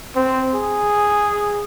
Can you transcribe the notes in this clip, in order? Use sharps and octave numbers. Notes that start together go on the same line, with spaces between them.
C4
G#4